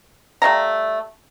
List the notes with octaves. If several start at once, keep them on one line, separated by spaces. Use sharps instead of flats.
G3 A3 F5 A#5